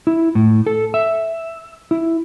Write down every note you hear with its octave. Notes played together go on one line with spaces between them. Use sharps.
E4
A2
A4
E5
E4